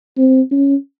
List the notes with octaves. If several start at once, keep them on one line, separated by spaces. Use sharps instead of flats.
C4
C#4